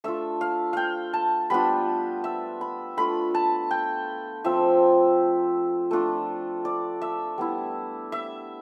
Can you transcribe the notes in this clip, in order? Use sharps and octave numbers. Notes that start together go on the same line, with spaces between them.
A3 D4 F4 E5
F5
F5 G5
A5
G3 B3 D4 F4 B5
E5
B5
A3 D4 F4 B5
A5
G5
F3 C4 F4 E5
A3 D4 F4
D5
E5
G3 B3 E4
E5